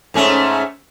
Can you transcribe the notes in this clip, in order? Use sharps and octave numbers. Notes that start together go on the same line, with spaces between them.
G#2 A3 C#4